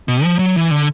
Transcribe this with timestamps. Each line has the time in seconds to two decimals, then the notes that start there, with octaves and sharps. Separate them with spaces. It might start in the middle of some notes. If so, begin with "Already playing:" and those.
0.08 B2
0.24 F3
0.39 F#3
0.56 E3
0.71 D3